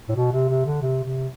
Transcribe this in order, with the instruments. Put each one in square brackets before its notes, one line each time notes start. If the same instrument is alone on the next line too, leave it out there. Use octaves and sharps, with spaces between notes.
[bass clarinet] A2
B2
C3
C3
D3
C3
C3